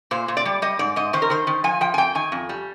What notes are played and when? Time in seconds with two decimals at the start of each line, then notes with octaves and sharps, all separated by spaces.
0.11 A#2 C5
0.28 A#2
0.37 D5
0.45 G3
0.62 G3 D#5
0.79 G#2 D5
0.96 G#2 D#5
1.13 D#3 C5
1.22 A#4
1.30 D#3 C5
1.47 D#3
1.64 F3 G#5
1.81 F3 G5
1.94 G#5
1.98 F2 G5
2.15 D#3 G#5
2.32 F2
2.49 G3